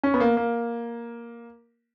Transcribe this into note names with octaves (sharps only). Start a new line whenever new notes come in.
C#4
B3
A#3
A#3